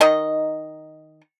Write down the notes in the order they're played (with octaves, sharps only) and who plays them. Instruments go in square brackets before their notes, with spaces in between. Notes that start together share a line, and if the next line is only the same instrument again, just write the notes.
[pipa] D#3 D#4 D#5